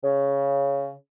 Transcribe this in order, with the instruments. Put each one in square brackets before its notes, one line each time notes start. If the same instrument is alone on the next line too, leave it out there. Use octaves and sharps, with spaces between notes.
[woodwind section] C#3